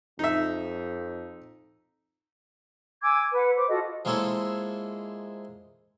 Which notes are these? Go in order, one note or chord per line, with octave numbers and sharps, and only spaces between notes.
F2 D#4 E5
G#5 D6 E6 G#6
B4 F#5
C5 D6
F4 F#4 A4 D#5
F3 G#3 A#3 E4 A4 C#5